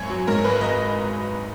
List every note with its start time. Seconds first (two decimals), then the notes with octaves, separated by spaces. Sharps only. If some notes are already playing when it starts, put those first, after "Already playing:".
Already playing: G#1 F#2 C#5
0.10 F#3
0.28 G#2 A#4
0.44 G#1 B4
0.61 G#1 D#5